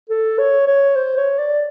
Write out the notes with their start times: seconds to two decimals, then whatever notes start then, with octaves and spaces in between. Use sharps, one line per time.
0.10 A4
0.38 C#5
0.67 C#5
0.96 C5
1.17 C#5
1.38 D5